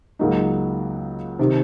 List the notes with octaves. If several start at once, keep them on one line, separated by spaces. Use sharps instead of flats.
C#2 C#3 F#3 A#3 D#4
C3 D#3